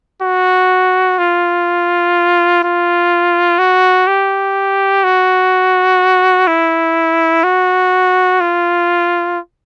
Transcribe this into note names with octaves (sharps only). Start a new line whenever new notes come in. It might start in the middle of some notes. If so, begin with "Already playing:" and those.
F#4
F4
F4
F#4
G4
F#4
E4
F#4
F4